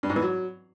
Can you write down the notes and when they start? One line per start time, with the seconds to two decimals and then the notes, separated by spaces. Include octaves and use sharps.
0.03 G2
0.10 G#2
0.16 E3
0.23 F#3